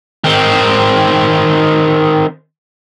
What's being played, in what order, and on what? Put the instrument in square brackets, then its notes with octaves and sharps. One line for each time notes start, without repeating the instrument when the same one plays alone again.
[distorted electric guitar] D#3 C4